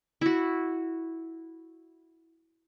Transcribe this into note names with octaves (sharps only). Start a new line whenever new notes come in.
E4 F#4